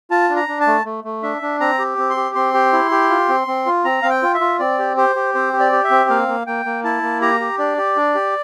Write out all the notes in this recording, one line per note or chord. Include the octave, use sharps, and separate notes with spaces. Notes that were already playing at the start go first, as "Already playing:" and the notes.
F4 A5
D4
A#5
D4
A5
A3
A3
A3
D4 E5
D4
C4 A#5
G4
C4
C6
G4
C4 C6
G4
E4
G4
F4
C4
C4
F4
C4 A#5
C4 F5
G5
F4
E5
F4
C4 D5
G4
G4 C5
G4
C4 C5
G4
D5
G4
E5
C4
A#3 F5
A#3
A#3 G5
A#3
E4 A5
A#3
G4 A#5
G4
D4 D5
G4
D4
G4